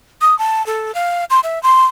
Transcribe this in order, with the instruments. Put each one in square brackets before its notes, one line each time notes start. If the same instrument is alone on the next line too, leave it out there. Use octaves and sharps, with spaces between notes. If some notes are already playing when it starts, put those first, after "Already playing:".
[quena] D#6
A5
A4
F5
C6
E5
C6